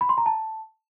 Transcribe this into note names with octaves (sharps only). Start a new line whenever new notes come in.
B5
C6
A#5
A5